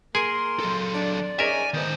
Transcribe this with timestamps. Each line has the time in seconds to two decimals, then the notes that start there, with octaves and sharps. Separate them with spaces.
0.15 A#3 G#4 A#4 G#5 C6
0.60 F#3 A4
0.94 D4 D5
1.39 C#4 D#4 G#4 A#4 E5 G#5
1.74 D#3 B3 D#4 C5